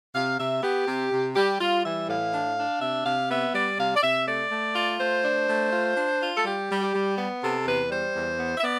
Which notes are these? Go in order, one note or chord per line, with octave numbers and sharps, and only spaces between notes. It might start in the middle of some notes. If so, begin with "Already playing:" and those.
C3 F5
C3 E5
B3 G4
C3
C3
G3 G4
G3 F4
E3 E5
A2 F5
D4
D4
C3 E5
C3 F5
B3 E5
G3 D5
C3 F5
D5
C3 E5
A3 D5
A3
F4
A3 C5
D4
A3
F4
D4
F4
A4
G3 G4
G3
G4
G3
B3
C3 A4
E2 B4
G3 C5
E2
B3
E5
B3 D5